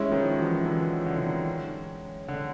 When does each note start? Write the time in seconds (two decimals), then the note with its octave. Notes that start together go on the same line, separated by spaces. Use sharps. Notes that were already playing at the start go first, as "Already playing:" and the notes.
Already playing: G#3 C#4 E4
0.11 D#3 F3
0.28 F3
0.39 E3 F#3
0.66 D3 E3
1.06 D3
1.18 D3
1.27 D#3
2.28 D3